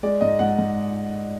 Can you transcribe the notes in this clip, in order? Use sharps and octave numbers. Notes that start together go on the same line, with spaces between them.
G#3 D5
G#2 D#5
G#2 F#5
G#2